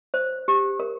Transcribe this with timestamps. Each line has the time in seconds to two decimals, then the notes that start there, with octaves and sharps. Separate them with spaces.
0.14 C5
0.48 G4
0.80 A#4